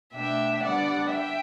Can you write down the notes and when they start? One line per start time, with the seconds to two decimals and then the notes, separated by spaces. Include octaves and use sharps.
0.15 B2 A3 D4 E5 G5
0.64 D3 G3 B3 D4 D5 F#5
1.11 E5 G5